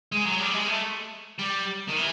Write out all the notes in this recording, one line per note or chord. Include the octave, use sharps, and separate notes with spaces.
G#3
F#3
G3
G#3
A3
G3
D#3
E3